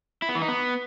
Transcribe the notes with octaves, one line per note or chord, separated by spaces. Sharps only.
E4
B3
E3
D#4
B3